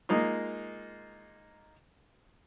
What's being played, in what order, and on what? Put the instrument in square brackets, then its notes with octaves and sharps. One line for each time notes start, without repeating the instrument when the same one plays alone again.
[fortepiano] G#3 A#3 D#4 F4